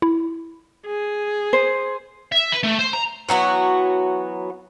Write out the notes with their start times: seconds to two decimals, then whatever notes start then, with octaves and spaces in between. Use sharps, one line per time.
0.02 E4
0.86 G#4
1.53 C5
2.32 E5
2.52 B4
2.63 A3
2.79 C5
2.93 A#5
3.29 E3 F#3 B3 F#4